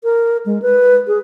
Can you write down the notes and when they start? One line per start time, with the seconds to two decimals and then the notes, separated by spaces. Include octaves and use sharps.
0.04 A#4
0.46 G#3
0.62 B4
1.07 G#4